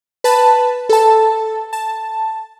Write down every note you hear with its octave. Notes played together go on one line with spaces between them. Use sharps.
B4 A5 B5
A4 A5
A5